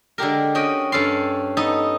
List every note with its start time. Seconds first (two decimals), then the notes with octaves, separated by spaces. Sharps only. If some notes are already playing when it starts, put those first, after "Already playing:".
0.18 D3 G#3 G4 A#4
0.55 C#4 F#4 D#5 G5
0.92 G2 C#4 A4 F5 C6
1.57 B3 D#4 A4